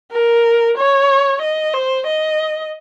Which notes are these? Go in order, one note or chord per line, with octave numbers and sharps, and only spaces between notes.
A#4
C#5
D#5
C5
D#5